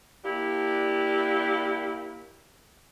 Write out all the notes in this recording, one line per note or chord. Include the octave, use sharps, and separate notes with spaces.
A#3 D4 E4 G4